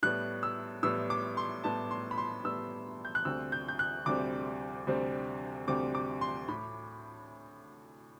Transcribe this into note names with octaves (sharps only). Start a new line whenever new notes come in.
A2 G3 B3 F#6
E6
A2 G3 B3 E6
D6
C6
A2 G3 B3 A5
C6
B5
C6
A2 G3 B3 E6
G6
F#6
D2 C3 G3 C4 E6
G6
G6
F#6
D2 C3 G3 C4 D6
D2 C3 G3 C4
D2 C3 G3 C4 D6
D6
C6
A2 B5